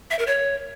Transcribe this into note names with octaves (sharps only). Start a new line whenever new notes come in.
E5
A#4
C#5